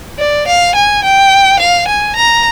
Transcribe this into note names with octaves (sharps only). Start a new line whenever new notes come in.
D5
F5
G#5
G5
F5
G#5
A#5